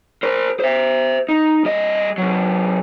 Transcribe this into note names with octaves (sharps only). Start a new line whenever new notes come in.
A#4 C5
C5 E5
D#4
G3 D#5
C3 F#3